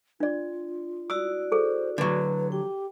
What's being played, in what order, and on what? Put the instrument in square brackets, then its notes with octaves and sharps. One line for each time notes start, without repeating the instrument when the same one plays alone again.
[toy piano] D4 D5 [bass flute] F4
[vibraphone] E4 F#4 D5 [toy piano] D#6 E6
[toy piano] G#4 A4 [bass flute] C5
[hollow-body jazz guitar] D3 F#3 [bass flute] B4
[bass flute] G4 [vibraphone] G5